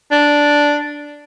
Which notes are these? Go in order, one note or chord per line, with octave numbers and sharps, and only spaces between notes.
D4